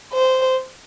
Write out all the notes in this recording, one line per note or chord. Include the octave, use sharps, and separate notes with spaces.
C5